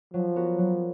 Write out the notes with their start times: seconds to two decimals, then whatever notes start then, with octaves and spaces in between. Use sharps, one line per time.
0.13 F3 F#3
0.36 B3 F#4 A#4
0.58 F#3